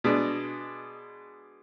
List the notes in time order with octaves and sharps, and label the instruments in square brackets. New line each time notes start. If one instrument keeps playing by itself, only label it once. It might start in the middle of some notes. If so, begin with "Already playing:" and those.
[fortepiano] B2 G#3 D4